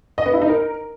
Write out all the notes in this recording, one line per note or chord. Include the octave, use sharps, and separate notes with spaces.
D#5
B3
E4
D#4
A#4